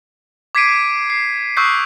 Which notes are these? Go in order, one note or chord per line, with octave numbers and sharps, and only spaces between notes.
D6 G#6 B6 C7 D7 D#7
C7
C#6 D#6 E6 F#6 G6 C7